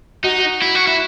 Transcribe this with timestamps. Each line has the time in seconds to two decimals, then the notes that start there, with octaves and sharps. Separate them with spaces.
0.24 D#4 F#4
0.62 E4
0.75 F#4
0.87 E4